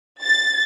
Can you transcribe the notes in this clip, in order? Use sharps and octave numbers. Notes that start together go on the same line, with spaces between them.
A6